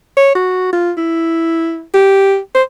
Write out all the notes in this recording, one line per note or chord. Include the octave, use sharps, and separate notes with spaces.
C#5
F#4
F4
E4
G4
C5